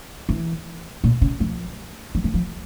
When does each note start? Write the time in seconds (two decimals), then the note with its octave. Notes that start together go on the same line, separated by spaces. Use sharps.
0.29 E3
1.04 A#2
1.21 C#3
1.40 F3
2.15 F3
2.24 E3
2.34 F3